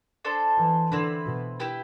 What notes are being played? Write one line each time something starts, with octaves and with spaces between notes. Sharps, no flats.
D4 A4 C5
E3
D3 C4 E4 B4
B2
E4 G4 B4